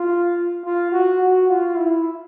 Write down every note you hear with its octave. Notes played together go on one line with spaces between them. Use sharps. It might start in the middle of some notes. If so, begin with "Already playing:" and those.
Already playing: F4
F4
F#4
F#4
F4
E4